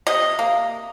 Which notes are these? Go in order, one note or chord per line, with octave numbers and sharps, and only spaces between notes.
C3 D#5
A#3